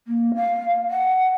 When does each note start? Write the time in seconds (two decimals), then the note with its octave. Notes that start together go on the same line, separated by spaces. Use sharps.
0.07 A#3
0.35 F5
0.90 F#5